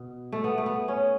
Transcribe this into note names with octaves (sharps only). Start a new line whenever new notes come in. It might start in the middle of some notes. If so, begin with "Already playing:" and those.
Already playing: B2
A3
B3
A3
B3
C#4